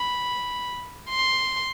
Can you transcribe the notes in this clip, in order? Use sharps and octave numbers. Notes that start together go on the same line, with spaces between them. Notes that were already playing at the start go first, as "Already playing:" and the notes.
Already playing: B5
C6